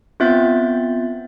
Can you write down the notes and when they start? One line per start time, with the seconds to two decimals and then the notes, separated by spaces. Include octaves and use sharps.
0.20 B3 C4 F4 E5 G6 A6